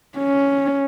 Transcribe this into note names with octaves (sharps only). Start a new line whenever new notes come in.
C#4